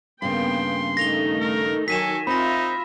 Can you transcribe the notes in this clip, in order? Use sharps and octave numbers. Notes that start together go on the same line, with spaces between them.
G2 C#3 A#3 B3 G5 C6
D#3 A3 D#4 A#6 F7 G7
A#4
D#3 F#3 A4 G#5 B6 D#7 E7
C4 D#4 F4 E5 B5 A#6